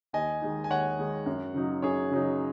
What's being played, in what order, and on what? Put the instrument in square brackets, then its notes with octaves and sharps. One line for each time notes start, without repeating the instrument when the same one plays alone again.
[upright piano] D#2 [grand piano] D#5 G#5
[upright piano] D#3 G#3 D#4
[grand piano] G#5
[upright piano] D#2 [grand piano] C#5 F#5
[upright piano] D#3 G#3 D#4
F#2
C#3 F#3 D#4
[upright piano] F#2 [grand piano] G#4 C#5
[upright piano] C#3 F#3 D#4